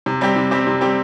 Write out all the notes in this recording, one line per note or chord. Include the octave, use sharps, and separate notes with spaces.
C3
G3 C4 G4
C3
G3 C4 G4
C3
G3 C4 G4